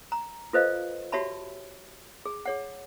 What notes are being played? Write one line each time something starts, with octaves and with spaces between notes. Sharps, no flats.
A#5
F4 A4 B4 C5 D#5 F5
F#4 G4 C#5 E5 A5 B5
G#4
G#4 C#5 F#5